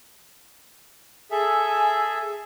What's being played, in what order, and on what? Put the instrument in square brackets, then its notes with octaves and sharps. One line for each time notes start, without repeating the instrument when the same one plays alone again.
[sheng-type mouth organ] G#4 A4 E5 [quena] G#5